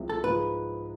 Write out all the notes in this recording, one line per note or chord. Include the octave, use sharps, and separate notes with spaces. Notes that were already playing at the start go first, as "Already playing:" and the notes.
Already playing: C2 C3 F3 G#3
A4
G#2 F3 G#3 B4